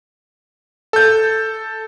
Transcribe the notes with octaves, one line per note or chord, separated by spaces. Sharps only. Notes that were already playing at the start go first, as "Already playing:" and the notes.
A4 G6